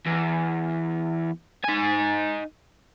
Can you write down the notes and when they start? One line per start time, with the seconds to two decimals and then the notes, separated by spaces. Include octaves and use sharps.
0.06 E2
1.64 D#4 G#5